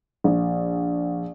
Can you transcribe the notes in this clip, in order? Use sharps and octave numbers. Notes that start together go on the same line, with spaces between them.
A#1